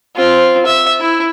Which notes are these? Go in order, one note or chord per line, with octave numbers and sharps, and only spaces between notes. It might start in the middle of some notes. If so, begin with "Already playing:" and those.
C4 F4
E5
E4